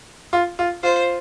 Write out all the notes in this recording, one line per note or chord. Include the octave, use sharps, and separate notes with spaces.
F4
F4
F4 C5